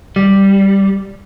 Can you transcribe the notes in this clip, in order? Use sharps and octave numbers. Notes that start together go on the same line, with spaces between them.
G3